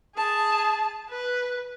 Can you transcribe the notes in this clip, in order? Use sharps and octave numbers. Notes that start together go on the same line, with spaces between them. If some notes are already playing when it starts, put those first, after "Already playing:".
G#4 A5
B4